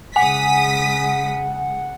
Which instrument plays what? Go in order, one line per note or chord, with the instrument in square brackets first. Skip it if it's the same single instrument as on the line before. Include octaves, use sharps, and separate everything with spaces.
[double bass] C#3 G#3 [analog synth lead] F#5 [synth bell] G#5 [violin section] D#6 B6